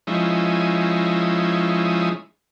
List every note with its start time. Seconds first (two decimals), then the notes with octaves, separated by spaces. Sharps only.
0.07 F3 G#3 C#4 D#4 E4